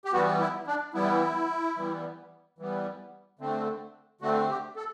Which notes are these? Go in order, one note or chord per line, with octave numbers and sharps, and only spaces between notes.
G4
E3 G3 B3 F#4
E4
D4
E3 G3 B3 E4
E3 G3 B3
E3 G3 B3
D3 A3 C4
D3 A3 C4 F#4
G4
A4